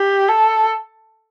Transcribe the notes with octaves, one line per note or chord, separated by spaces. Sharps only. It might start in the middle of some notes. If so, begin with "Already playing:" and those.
Already playing: G4
A4